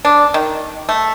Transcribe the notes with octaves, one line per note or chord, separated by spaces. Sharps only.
D4
D#3
A3